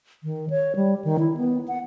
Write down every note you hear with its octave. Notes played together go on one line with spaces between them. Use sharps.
D#3
C#5
G3
D#3
E4
B3
F#5